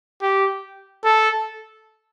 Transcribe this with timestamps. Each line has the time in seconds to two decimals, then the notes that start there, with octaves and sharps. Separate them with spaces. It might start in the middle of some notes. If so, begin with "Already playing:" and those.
0.21 G4
1.04 A4